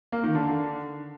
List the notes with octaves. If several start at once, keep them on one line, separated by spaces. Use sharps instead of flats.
A#3
D#3
D3